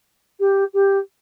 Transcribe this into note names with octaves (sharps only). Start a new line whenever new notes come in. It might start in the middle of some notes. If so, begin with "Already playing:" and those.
G4
G4